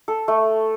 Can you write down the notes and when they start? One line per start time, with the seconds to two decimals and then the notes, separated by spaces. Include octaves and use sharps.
0.08 A4
0.28 A3